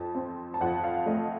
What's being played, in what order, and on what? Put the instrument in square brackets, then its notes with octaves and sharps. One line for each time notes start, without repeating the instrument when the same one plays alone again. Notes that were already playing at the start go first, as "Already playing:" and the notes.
Already playing: [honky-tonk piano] F2 A5
C4
A5
F2 F#5
F5
A3 D#5